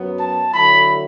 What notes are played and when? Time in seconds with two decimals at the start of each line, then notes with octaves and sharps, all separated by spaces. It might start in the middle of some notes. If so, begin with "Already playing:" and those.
Already playing: F#2 F#3 B3
0.19 A5
0.53 D3 F#3 A3 E4 B5